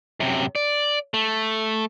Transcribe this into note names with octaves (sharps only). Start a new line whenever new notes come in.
F#2 C3
D5
A3